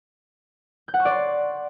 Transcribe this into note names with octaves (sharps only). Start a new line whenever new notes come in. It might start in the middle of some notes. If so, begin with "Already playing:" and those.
G6
F#5
C#6
D5
C6